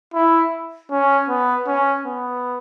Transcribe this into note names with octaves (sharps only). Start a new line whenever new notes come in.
E4
C#4
B3
C#4
B3